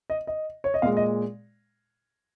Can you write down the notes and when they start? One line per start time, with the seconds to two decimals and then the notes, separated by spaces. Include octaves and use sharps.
0.10 D#5
0.27 D#5
0.64 C#5
0.74 D#5
0.82 A#2 G#3 F5
0.97 D#5